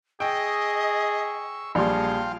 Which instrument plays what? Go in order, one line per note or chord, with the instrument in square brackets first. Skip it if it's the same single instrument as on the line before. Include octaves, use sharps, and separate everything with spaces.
[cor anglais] G#4 [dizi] D#5 [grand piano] G5 [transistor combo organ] C#6 E6
[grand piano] A#1 G3 C6 [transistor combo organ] F4 F5 G5 [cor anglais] G#4 [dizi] A5